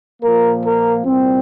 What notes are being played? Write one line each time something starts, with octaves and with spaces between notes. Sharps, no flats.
A#2 F3 A#3 A#4
A#4
C2 A#2 G3 C4